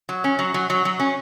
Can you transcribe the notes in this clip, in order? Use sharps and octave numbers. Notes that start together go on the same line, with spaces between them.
F#3
C#4
F#3
F#3
F#3
F#3
C#4